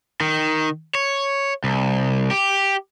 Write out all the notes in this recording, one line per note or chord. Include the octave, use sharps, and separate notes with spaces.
D#3
C#5
C2
G4